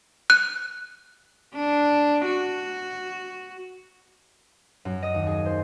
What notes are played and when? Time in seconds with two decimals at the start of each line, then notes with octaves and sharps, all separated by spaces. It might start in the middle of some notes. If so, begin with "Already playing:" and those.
0.30 F#6
1.55 D4
2.25 F#4
4.85 F#2
5.03 D#5
5.14 D#2
5.26 G#4
5.46 C5